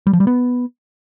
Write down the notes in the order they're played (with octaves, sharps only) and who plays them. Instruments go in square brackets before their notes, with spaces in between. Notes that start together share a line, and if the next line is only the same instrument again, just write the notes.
[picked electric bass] G3
F3
G3
B3